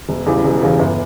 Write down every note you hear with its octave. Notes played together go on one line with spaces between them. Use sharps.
E1
E2 C#3 E3 G3
E1
E2 C#3 E3 G3
G1